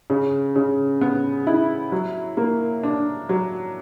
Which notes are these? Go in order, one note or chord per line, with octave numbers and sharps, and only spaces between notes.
C#3
C#3
B3
E4
F#3
A#3
D4
F#3